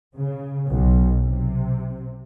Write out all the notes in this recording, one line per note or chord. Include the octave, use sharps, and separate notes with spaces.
C#3
B1
C3